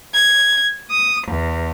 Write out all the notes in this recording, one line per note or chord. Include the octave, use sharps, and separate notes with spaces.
G#6
D#6
E2